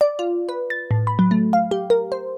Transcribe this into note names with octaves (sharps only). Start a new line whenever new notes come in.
D5
F4
B4
A6
A2
B5
F#3
A3
F5
G4
A#4
C5